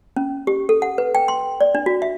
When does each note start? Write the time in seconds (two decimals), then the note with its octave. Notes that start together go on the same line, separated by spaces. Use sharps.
0.16 C#4
0.47 G4
0.69 A4
0.82 F#5
0.98 B4
1.15 G5
1.28 C6
1.61 D5
1.75 D4
1.86 F#4
2.02 E5